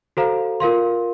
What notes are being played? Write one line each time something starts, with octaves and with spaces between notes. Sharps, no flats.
F#4 A4 C5 F5 A#5
F4 A#4 F5 C6